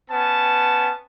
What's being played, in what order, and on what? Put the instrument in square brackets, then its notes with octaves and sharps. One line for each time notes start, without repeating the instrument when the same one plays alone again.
[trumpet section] B3 C#4 A5